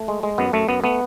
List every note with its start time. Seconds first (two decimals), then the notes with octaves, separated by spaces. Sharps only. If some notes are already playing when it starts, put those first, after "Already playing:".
Already playing: A3
0.08 G#3
0.23 G#3
0.38 F#2 B3
0.53 F#2 A3
0.69 F#2 B3
0.84 A3 B3